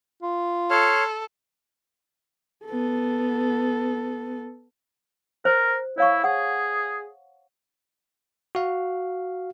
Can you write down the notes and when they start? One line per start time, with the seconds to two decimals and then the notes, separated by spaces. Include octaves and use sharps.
0.22 F4
0.70 A4 C#5 C6 F6
2.66 B3 A4
5.45 A#4 C5
5.98 E4 C#5 F5 C#6
6.24 G#4 F#5
8.55 F#4 F5